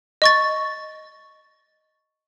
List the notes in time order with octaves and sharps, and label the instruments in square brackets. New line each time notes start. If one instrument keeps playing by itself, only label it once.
[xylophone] D#5 C#6 A6